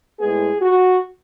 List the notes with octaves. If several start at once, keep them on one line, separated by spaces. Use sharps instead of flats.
A2 G#3 B3 G#4
F#4